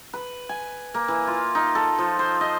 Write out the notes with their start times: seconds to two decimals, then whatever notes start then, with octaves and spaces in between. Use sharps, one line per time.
0.13 B4
0.49 G#5
0.94 A#3
1.08 E3
1.27 F4
1.55 D#4
1.75 A4
1.99 F3
2.19 C5
2.41 D#5